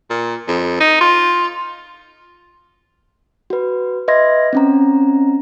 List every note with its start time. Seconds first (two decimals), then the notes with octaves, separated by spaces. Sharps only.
0.10 A#2
0.48 F2
0.80 D#4
1.01 F4
3.50 F#4 B4
4.08 B4 D#5 E5 C6 G#6 A#6
4.53 C4 C#4 A#5